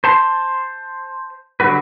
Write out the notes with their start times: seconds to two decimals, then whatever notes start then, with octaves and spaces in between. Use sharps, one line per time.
0.04 C5 A5 C6
1.60 D3 F#3 G3 F#4 B4